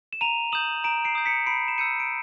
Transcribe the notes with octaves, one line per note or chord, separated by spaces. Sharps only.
E7
A#5 D#7 F7
D#6 G6 E7 F#7
A#5 D7 E7
C7 D7
D#6 G6
B6 C#7
B5 C7 D7
E7
E6 G6 C#7 D#7
D7